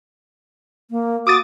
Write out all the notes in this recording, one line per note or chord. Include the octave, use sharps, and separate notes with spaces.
A#3
F#4 D6 D#6 A6